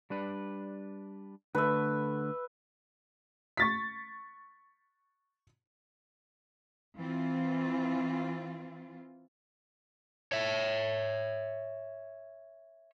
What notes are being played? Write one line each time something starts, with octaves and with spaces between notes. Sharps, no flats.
G3 D4 B4
D3 A3 B4 E5
C#6 A6 B6
E3 C4 F4
C#5 E5